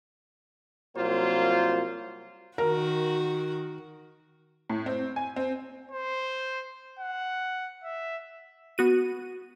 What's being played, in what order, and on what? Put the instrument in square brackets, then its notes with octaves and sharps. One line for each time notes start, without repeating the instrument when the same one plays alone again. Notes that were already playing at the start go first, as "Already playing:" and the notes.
[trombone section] C2 F#3 A#3 F4 C5
[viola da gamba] D#3 F#4 [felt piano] A#4
[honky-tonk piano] A2
C4
G#5
C4
[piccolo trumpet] C5
F#5
E5
[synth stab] B3 F#4 D#7